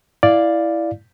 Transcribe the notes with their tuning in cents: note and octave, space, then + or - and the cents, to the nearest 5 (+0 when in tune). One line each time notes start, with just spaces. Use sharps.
E4 +0 D5 +0 F5 +0